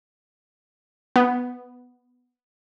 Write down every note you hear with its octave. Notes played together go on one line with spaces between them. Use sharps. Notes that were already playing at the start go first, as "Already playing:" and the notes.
B3